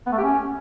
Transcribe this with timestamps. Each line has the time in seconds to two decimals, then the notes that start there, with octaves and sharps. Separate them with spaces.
0.06 B3
0.12 A3
0.18 G4
0.24 C#4